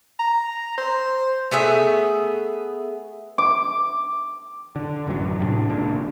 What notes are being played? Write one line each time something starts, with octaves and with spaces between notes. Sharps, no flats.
A#5
C5
A3 B3 G#4 E5
D6
D3
A1 F#2 E3 F#3
A2 C3 D4
G#1 C#2 A#2 D4